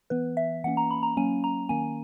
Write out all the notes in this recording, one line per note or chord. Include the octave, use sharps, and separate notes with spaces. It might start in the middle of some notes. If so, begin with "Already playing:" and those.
E3 B3 B4
E5
E3 A#3 C#4 F#5
A#5
B5
A#5
F#3 A#3 C#4 G#5
A#5
D#3 A#3 C#4 G#5